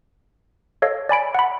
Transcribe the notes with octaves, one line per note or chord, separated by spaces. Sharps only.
A4 C#5 D#5 F5
D5 G#5 B5 D7
F#5 B5